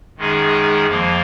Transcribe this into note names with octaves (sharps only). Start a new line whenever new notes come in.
F#2 D#3 G#3 D#4 G#4
F2 F3 A#3